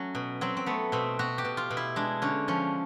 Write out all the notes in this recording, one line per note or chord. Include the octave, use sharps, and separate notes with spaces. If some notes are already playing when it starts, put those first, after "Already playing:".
Already playing: F#3 A3 C#4
B2
F#3 C4
C4
A3 B3
B2 C4
B2 F#4
G4
B2
F4
B2
E4
G#3 D4
D3 C#4
F3 C#4